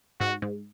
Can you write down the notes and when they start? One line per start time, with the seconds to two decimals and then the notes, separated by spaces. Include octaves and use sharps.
0.20 G#2 F#4
0.42 G#2